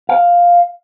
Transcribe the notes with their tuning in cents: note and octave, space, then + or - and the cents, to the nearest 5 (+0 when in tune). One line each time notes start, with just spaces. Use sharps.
F5 +5